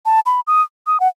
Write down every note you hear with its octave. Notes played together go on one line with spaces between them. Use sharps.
A5
B5
D#6
D#6
F#5